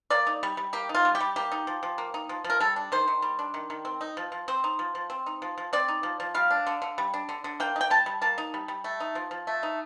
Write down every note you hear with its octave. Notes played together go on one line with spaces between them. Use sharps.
A#3 D5
D#4
G3
G3
A#3 G4
D#4
F4
G3
G4
G3
A#3 G4
D#4
F3
F3
A#3
D#4
F3
F3
A#4
G3 A4
D4
D#3 C5
D#3
G3
D4
D#3
D#3
C4
D#4
F3
F3
C4 C5
D#4
F3
F3
C4
D#4
F3
F3
C4 D5
D#4
F3
F3
G3 F5
D4
D3
D3
G3
D4
D3
D3
A#3 G5
D#4
G5
G3 A5
G3
A#3 A5
D#4
G3
G3
A3
D#4
F3
F3
A3
D#4